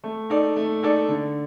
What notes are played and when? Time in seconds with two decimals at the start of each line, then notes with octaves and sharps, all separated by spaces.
0.04 A3
0.30 D#4 A4 D5
0.56 A3
0.83 D#4 A4 D5
1.08 D3